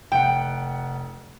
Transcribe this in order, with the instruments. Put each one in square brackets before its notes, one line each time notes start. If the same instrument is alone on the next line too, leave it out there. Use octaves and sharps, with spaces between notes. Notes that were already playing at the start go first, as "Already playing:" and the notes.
[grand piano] F1 F#5 [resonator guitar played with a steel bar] G5